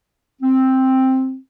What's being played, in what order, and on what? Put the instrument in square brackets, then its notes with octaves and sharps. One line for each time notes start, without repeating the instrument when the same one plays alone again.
[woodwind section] C4